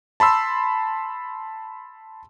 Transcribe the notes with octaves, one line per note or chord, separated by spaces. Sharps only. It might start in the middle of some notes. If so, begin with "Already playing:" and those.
A5 B5 C6 E6